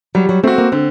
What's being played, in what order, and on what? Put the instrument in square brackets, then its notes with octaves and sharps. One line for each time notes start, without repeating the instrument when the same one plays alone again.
[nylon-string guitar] F#3 [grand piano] G3
[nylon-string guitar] F#3
[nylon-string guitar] A3 [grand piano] C4 F#4
[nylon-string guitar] A#3
[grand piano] D3 [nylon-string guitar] C4